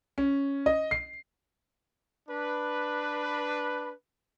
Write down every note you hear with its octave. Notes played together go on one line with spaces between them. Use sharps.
C#4
D#5
C7
D4 B4